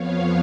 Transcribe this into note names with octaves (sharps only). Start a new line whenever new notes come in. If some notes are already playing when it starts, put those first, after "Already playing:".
Already playing: F2 F3 B3 C#5 F5